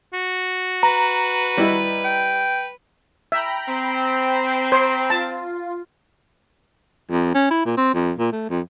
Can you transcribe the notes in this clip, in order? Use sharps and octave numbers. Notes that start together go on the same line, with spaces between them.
F#4
B4 A#5
G3 E4 D#5
G5
E5 G5 A#5 B5
C4
C5
F4 A5
F2
C#4
E4
A#2
C4
F2
A#2
A3
F2